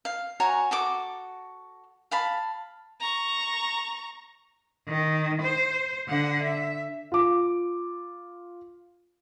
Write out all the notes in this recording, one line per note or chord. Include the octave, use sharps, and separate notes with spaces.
F5
F#4 C#5 G#5 A#5
F#4 A4 D6
F5 A5 B5
A#5 C#6
D#3
C5
D3 F#5
E5
F4 D6